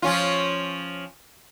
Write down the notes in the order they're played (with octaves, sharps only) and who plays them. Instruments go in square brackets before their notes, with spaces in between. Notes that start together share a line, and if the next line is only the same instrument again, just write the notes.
[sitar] F3 C#4 F4